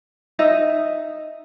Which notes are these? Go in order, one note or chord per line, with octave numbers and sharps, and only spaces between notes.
D#4 D#5 E5